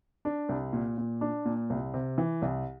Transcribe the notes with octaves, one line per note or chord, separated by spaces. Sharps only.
D4
C2
A#2
A#2
D4
A#2
C2
C3
E3
C2